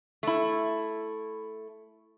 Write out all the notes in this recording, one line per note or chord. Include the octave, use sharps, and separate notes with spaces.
A3 E4